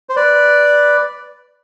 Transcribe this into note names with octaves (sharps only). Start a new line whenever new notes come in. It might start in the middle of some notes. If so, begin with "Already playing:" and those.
C5
B4 D5